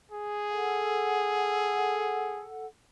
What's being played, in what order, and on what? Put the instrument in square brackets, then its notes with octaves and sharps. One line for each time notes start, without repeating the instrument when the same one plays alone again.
[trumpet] G#4
[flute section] A4 F#5